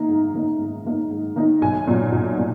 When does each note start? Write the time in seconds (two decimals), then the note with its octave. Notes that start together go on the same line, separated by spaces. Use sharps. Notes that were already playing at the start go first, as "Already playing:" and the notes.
Already playing: D#3 A#3 D#4 A#5
0.09 G#2
0.34 D#3 A#3 D#4
0.59 G#2
0.85 D#3 A#3 D#4
1.10 G#2
1.36 D#3 A#3 D#4
1.62 B1 G#5
1.87 A#2 F#3
2.12 B1
2.38 A#2